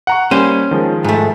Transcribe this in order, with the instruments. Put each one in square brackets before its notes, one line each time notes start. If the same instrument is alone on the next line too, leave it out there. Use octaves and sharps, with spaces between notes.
[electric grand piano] F#5 A#5 C#6
[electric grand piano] G3 A#3 D#7 [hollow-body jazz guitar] C#4 C5
[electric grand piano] D#3 F3 G#3
[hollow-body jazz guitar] G#2 A3